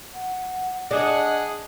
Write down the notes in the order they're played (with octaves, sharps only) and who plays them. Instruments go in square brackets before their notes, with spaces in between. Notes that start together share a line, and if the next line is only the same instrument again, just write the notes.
[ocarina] F#5
[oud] D4 [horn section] G#4 F#5 [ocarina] D#5